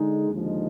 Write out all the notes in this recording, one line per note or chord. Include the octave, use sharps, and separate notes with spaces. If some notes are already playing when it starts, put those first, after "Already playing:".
Already playing: D3 G#3 D#4
D#2 D3 F3 G#3 D#4